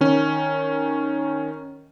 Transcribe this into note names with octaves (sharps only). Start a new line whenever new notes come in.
D#3 C#4